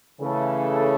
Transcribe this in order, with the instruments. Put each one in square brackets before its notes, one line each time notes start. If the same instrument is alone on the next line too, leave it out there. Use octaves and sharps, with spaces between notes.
[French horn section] C#3 [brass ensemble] E3 A3 E4 A4